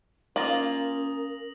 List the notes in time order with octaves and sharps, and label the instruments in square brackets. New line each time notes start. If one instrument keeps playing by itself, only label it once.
[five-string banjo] A#3 F4 [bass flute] C#4 [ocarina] A#4 [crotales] D#6 A#6 F#7